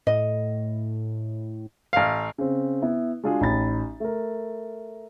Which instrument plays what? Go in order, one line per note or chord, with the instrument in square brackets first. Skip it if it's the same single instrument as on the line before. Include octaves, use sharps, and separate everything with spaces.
[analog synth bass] A2 [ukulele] D#5
[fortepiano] A1 F5
[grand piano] C#3 C4
B3 E4
G#3 D4 F4 F#4 G#4
A1 D#4 B5 A6
A3 A#4